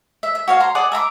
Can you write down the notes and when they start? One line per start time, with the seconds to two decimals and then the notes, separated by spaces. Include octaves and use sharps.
0.23 E5
0.35 E5
0.48 F#4 C#5 F5
0.60 A#5 C6
0.75 G#4 D5 F#5
0.92 E5 A#5 B5 D6